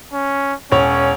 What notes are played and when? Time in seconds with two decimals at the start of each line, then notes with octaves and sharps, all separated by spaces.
0.13 C#4
0.72 E1 C#4 C#5